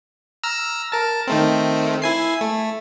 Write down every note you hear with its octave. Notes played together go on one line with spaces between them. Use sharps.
A#5 E6 F6
A#4 A5
D#3 A3 C4
E4 G#5 C7
A3